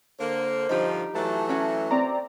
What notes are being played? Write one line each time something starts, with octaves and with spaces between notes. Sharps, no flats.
D3 A#3 C5
G2 D3 F3 D#4 G4
E3 F#3 A3 A5
C#4 F#4
C4 D5 A#5